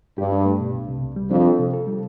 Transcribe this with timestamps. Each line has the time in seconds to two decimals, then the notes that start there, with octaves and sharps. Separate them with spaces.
0.18 G2 G4
0.32 D4
0.46 A3
0.60 B2
0.74 C2
0.89 C3
1.03 C2
1.16 G3
1.31 F2 D4
1.45 A4
1.59 C3
1.73 A4
1.87 G3